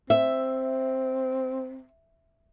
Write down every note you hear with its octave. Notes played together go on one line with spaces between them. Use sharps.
C4 E5